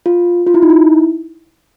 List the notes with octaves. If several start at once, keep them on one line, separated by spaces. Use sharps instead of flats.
F4
F4
E4
D#4
E4